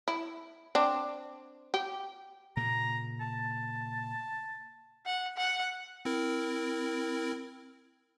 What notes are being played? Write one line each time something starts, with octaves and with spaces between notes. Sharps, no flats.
E4
C4 D4
G4
A#2 C#3 A#3 A#5
A5
F#5
F#5
C4 E4 A#4